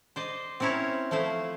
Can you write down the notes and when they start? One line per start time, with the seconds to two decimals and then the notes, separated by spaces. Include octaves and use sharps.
0.16 C5 D5 D#5
0.60 C4 C#4 E4 A#4 C#5
1.11 F3 A3 E4 C5